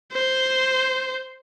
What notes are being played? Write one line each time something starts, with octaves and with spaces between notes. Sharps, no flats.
C5